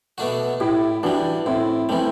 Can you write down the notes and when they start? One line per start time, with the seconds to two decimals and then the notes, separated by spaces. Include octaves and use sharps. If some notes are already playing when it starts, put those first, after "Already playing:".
0.18 B2 A3 D4 F#4
0.60 A2 E4 G4
1.03 E3 G3 D4 F#4
1.46 A2 C4 E4
1.89 E3 G3 A3 C4